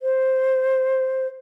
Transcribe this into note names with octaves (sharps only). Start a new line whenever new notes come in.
C5